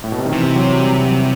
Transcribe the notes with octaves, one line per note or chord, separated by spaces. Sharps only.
A2
B2
C3
D#3
C3 E3
F#3
G3
F#3